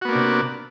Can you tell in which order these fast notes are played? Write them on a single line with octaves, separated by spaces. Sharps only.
F#4 B3 A#3 D4 C3